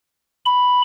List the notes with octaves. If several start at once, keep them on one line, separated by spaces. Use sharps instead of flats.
B5